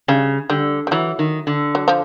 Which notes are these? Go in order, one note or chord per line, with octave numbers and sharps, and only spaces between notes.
C#3 G3
D3 G3
G3
E3 F#3
D#3
D3
F#3
F3